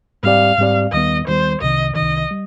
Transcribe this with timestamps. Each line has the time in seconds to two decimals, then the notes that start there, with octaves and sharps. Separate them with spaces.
0.23 G#2 G3 C4 G4 D5 F5
0.58 G#2 G3 C4 G4 D5
0.92 D#2 D#3 G3 B3 D#5
1.27 D#2 D#3 G3 B3 C5
1.62 C2 C3 D#3 D#5
1.96 C2 C3 D#3 D#5
2.31 G3